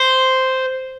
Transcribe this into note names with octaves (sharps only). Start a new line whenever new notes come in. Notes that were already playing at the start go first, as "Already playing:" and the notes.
Already playing: C5